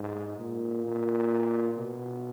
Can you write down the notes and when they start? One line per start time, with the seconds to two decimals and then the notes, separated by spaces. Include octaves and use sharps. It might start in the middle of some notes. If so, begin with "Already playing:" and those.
Already playing: G#2
0.39 A#2
0.85 A#2
1.77 B2